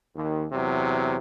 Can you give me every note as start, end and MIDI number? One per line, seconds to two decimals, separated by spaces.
0.15 0.46 39
0.52 1.17 40
0.52 1.17 48
0.52 1.17 54